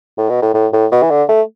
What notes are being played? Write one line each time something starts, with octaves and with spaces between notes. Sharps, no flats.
A2
B2
A2
A2
A2
B2
E3
D3
A3